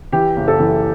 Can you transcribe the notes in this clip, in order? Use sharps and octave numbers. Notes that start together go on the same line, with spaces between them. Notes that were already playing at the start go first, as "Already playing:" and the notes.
E3 G4
F#1
A4
E3